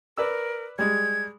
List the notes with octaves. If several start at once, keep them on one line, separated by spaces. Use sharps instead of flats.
A#4 B4 D5 E6
G3 G#3 G#6